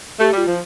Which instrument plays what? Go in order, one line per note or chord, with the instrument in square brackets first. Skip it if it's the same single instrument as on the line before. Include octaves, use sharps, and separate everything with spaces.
[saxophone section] A3 [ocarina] G4
[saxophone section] G3
[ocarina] F4
[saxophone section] F3